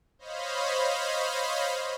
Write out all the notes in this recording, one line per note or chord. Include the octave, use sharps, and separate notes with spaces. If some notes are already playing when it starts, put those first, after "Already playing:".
C5 C#5 D#5 F5 B5